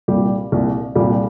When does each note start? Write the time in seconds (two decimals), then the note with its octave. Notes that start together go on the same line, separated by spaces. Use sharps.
0.08 C2 A#2 G3 G4
0.52 C2 A#2
0.95 C2 A#2 G3 G4